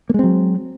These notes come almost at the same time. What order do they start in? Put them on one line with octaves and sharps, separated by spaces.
A#3 G#3 C4 F#3